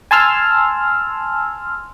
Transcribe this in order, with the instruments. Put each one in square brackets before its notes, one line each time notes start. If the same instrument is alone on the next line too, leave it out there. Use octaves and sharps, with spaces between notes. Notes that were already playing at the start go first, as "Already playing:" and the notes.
[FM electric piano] G#5 A5 C6 E6 F6